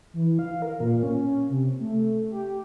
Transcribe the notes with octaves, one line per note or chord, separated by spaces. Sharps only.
E3
F5
A#4
A#2
C#4
C3
A3
G4